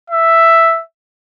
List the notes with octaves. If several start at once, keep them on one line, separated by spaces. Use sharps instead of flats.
E5